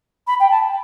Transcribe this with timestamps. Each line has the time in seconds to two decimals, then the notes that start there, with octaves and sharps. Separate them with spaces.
0.27 B5
0.40 G5
0.51 A5